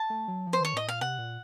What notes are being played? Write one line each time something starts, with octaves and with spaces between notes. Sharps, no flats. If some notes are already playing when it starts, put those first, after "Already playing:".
Already playing: A5
A3
F#3
F3
C5
D#3 C#5
A2 D#5
A#2 F5
C3 F#5
A#2